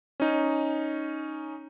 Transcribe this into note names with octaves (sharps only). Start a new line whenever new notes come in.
C#4 D#4